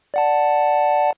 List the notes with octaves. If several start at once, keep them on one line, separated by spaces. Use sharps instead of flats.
D5 F#5 A5